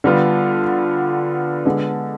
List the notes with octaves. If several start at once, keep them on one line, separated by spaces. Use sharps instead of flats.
D3 G3 B3 F4
D3 G#3 B3 D4